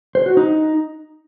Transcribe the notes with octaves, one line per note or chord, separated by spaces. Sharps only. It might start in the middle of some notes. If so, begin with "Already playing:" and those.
C5
F#4
D#4